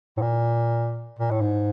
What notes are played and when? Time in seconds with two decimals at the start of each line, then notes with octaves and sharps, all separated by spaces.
0.17 A2
0.22 A#2
1.19 A#2
1.31 A2
1.41 G#2